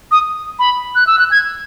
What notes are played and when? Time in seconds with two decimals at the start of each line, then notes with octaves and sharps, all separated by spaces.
0.11 D#6
0.59 B5
0.95 F#6
1.07 E6
1.19 F#6
1.31 G#6